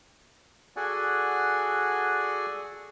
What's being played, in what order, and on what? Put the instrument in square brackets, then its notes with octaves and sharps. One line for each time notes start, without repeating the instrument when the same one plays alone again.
[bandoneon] F#4 G#4 A4 D5 F#5 G#5